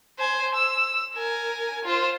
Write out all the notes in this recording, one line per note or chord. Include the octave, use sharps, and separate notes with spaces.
C5 G#5
E6
A#4 G#5
F4 C5